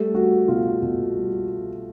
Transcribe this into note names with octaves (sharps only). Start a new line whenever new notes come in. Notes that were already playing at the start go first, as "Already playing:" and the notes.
Already playing: G3 A3 A4
G3 F#4
B2 F4
B2
G3